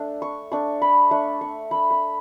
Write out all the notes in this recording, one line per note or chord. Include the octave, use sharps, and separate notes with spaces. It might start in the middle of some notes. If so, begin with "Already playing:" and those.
Already playing: A3 D4
C#6
A3 D4 C#6
B5
A3 D4 C#6
C#6
A3 D4 B5
B5